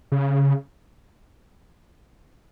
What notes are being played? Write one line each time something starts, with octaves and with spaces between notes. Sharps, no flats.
C#3